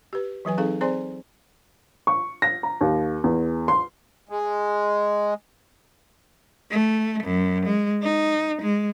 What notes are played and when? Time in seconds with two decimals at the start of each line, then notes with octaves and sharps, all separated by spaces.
0.13 G4 B4
0.45 E3 F#3 B4 G#5
0.57 C4 D#4 G#4 A4 F5
0.81 C4 G#4 C5 D5 G#5 C6
2.07 C#6
2.42 A#6
2.63 A#5
2.81 D#2
3.24 E2
3.68 C6
4.29 G#3
6.71 A3
7.23 F#2
7.66 G#3
8.02 D#4
8.62 G#3